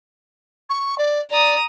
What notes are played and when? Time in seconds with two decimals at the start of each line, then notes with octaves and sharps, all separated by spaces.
0.69 C#6
0.98 D5
1.31 D5 A#5 D#6